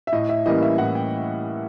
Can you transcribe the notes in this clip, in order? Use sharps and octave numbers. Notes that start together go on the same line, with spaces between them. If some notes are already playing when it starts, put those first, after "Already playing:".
E5
A2 D#5
E5
E3 G3 A#3 C#4 D#5
E5
A2 F#5
G5